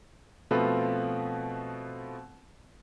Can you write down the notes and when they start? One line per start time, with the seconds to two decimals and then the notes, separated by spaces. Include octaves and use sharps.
0.51 B2 F3 A3 C4 F4 B4